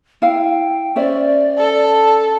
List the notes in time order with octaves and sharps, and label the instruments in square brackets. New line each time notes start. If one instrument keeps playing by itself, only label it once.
[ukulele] E4 F5 [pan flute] G5
[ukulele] C#4 C5 E5 [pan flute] D5
[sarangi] A4